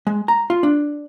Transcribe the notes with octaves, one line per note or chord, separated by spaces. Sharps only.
G#3
A#5
F4
D4